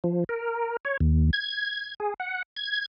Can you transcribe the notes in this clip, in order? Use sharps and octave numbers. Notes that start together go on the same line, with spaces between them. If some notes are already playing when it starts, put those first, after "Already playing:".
F3
A#4
C#5
D#2
G#6
G#4
F#5
G#6